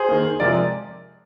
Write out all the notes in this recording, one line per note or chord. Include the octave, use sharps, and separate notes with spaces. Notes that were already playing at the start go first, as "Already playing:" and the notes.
Already playing: G#4 C5
D#3 A#3
C3 F3 G#3 A#4 D5